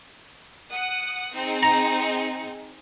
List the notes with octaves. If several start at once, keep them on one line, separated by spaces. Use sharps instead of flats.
F#5 D#6
C4 D#4 G#4
A#5